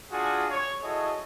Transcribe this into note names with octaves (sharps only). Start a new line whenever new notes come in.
D4 F4 F#4 G#4
C#5
E4 F#4 G#4 A4 C#5 D#5